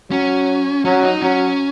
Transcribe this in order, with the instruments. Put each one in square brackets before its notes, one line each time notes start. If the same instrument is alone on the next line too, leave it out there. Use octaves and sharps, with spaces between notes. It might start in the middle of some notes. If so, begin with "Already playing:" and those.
[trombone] F#3 [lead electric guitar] C#4
[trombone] F#3 [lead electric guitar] C#4
[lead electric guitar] D#4
[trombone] F#3 [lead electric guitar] C#4